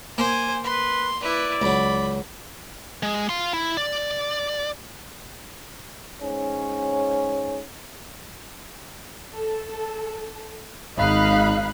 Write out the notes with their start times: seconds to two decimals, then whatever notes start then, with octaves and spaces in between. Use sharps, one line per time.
0.18 A#3 C5 G#5
0.64 B4 C6
1.23 E4 B4 D5
1.62 C#2 F#3 B5
3.03 G#3
3.29 F5 C6
3.53 E4
3.77 D5
6.22 G#2 C#4
9.33 A4
10.97 G#1 D#4 F5 B5 F#6